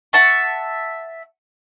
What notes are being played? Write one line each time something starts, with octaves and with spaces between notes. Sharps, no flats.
E5 F#5 A5 C#6